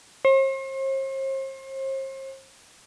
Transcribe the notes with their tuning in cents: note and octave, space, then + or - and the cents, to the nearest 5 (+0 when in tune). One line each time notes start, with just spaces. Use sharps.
C5 +40